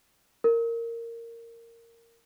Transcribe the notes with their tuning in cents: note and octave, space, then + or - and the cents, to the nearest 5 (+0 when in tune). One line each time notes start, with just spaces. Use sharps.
A#4 -15